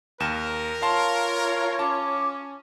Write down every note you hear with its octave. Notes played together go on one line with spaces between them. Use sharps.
D#2 A#4 E7
F4 C#5 F5 A5 C6
C#4 A5 D6